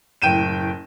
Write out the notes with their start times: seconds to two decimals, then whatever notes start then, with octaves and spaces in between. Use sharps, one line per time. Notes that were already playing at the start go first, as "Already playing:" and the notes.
0.22 F#1 A2 G5 D#7 E7